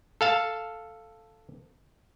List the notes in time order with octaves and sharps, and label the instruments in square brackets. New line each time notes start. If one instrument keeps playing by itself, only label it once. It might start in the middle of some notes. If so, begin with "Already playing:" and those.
[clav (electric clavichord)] A4 F5 A5